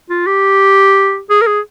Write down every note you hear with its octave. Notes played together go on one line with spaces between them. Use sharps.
F4
G4
G#4
A#4
G#4